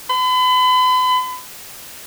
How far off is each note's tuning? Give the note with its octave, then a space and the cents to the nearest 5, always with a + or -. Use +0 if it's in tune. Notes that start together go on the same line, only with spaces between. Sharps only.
B5 +40